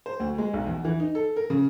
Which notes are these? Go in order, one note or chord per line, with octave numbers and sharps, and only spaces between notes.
C5
D2
G#3
B1
E2
E3
D#4
A4
A#4
C#3